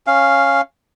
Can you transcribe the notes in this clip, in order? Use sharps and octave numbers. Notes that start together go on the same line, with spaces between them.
C#4 F5